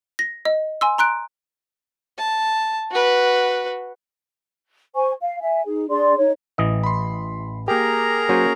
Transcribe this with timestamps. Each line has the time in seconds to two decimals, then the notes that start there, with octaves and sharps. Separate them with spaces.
0.19 A#6
0.45 D#5
0.81 G#5 C6 E6
0.98 A#5 C6 F#6 D7
2.18 A5
2.91 F#4 B4
4.96 C5 G#5 C#6
5.21 F5
5.41 E5 G#5
5.65 D#4 G#4
5.89 D4 G#4 D5 C6
6.18 D#4 C#5
6.58 A1 E3 D#5
6.83 B5 C6
7.68 A#3 G4 G#4 A#4 G5 A#5
8.29 F#3 A#3 C#4 F#4 C5